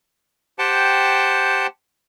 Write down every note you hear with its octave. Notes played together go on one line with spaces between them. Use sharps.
G4 C5 F#5 G5 A5